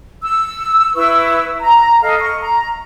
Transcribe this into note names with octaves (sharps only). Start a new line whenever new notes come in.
E6
E4 B4 C#6 E6
A#5
A4 D#5 F5
C#6
A#5